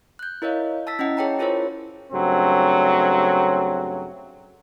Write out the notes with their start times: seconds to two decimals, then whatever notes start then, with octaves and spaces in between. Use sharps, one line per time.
0.19 F#6 G6
0.42 E4 A#4 C#5 D#5 F5
0.87 A5 E6 A6 B6
0.99 C#4 E4 D#5 F#5
1.17 G#4 C#5 G5 A5 A#5
1.39 E4 F4 G#4 A#4 C5 C#5
2.12 G2 C#3 F#3 A3 C4